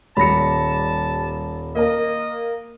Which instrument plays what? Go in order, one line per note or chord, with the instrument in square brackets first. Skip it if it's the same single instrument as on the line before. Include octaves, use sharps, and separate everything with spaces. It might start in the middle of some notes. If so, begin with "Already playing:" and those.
[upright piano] D#1 C#7 [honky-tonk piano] G3 [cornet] A5 [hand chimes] B5 A#6
[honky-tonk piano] A#3 A#4 [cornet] D#5